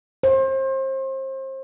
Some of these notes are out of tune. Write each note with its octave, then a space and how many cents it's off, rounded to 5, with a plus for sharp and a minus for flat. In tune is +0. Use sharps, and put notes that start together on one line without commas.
C5 +30